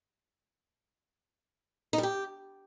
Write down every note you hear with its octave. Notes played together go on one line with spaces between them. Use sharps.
D#4
G3
G4